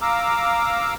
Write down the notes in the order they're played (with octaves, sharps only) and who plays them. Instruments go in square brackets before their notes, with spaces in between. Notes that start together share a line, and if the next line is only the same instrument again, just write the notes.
[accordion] F5 A#5 D6 E6